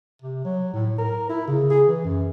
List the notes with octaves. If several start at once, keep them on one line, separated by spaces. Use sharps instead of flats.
C3
F#3
A2
A#4
E4
C#3
G#4
E3
F#2